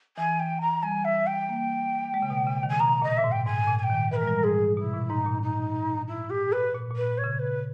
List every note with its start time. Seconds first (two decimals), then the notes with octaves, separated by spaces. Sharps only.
0.17 E3 G#5
0.39 G5
0.61 A#5
0.83 G3 G#5
1.05 E5
1.27 G5
1.49 A#3
2.14 G#3
2.22 C#3
2.30 B2
2.47 C#3
2.63 D#3
2.69 G#5
2.80 B2 A#5
3.01 A#2 D#5
3.17 A#2 E5
3.24 G#2
3.32 G5
3.46 G#2 G#5
3.67 A#2
3.79 G#5
3.83 G5
3.90 D#3
4.11 E3 B4
4.16 G#3 A#4
4.27 G3
4.44 G#2 G#4
4.77 B2 E4
4.93 A#2
5.09 G#2 D#4
5.26 A#2
5.43 D#4
6.08 E4
6.30 G4
6.52 B4
6.74 A#2
6.90 A#2
6.96 B4
7.18 C#5
7.24 C#3
7.39 B4